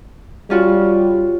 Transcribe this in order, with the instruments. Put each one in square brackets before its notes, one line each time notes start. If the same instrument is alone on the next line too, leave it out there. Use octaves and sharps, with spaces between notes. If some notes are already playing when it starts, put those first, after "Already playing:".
[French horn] G3 [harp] C#4 F4 F#4